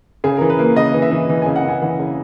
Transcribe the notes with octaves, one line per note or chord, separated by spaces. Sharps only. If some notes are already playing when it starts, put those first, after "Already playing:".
C#3 G#4
E3 A#4
B4
A#3
C#3 D#5
E3
E5
E3
E3
C#3 G#5
F#5
C#3 G#5
E3 F#5
C#3